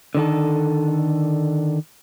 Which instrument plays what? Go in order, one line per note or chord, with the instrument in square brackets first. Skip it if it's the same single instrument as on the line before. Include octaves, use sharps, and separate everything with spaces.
[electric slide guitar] D3 D#3 A4